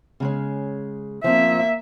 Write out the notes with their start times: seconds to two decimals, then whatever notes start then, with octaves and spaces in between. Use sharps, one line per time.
0.20 C#3 G#3 C#4
1.24 F3 A#3 C4 E5